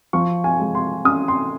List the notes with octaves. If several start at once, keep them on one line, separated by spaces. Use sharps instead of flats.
F3 C#6
G#5
G#3
C6
C#4 D#6
C6